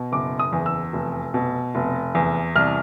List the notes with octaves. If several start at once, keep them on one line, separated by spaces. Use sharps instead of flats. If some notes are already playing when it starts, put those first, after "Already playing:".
Already playing: B2
F#1 D6
D#6
E2
E6
F1
B2
F1
E2
C2 F6